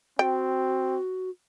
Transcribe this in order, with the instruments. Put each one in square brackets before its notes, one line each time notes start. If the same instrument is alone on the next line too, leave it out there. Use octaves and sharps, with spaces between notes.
[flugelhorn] C4 [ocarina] F#4 [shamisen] G5